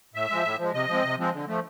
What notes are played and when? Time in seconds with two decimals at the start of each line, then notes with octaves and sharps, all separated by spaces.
0.14 A2 E5
0.29 F3 G#3
0.44 A2
0.59 F3 G#3
0.74 C3 D#5
0.88 F3 G#3 C4
1.04 C3
1.19 F3 G#3 C4
1.33 D3
1.48 F3 A3